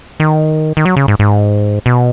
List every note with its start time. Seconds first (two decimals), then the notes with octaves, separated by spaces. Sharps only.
0.20 D#3
0.77 D#3
0.85 F#3
0.96 C#3
1.08 G#2
1.19 G#2
1.86 B2